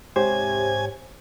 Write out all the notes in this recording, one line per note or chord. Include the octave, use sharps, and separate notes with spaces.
G#2 C3 G4 C5 C#5 G#5